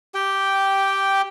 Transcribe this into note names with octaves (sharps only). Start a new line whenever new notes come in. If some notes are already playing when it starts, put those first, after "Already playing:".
G4 G5